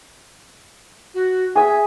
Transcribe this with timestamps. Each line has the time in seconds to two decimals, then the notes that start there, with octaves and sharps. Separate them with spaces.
1.14 F#4
1.56 G#4 E5 G#5